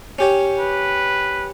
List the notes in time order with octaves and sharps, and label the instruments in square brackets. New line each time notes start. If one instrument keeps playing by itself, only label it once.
[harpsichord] C#4 G4 C#5
[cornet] B4